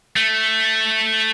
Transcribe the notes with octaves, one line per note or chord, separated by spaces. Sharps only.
A3